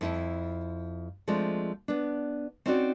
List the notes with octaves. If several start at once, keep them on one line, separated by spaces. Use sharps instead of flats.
F2 E4
F3 G#3 A3 C4 D4
B3 D4
C4 C#4 D#4 E4 F#4 D5